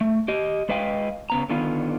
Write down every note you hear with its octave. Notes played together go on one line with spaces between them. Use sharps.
A3
G4 D#5
G#3 B4 D#5 F5 G5
C#3 B3 A#5
D3 D#3 B3 F4